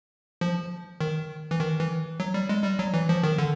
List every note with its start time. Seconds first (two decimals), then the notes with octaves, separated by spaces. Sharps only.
0.41 F3
1.01 D#3
1.51 E3
1.60 D#3
1.80 E3
2.20 F#3
2.34 G3
2.49 G#3
2.64 G3
2.79 F#3
2.94 E3
3.09 F3
3.23 D#3
3.38 D3